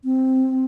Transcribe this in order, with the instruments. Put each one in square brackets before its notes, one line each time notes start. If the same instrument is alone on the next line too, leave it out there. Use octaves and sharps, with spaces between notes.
[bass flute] C4